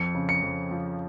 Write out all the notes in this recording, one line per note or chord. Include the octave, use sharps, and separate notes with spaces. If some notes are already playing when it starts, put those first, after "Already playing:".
Already playing: F2 C#7
C#3
C#7
F2
F3